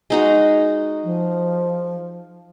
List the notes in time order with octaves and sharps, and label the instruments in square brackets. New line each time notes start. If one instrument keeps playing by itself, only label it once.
[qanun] G#3 D#4 F#4
[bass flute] F3